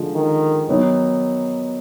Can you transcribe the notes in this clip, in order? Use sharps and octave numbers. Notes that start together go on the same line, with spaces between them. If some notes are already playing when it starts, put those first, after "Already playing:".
Already playing: D3 F3 G#3 D#4
D#3
D#3 F#3 B3 D#4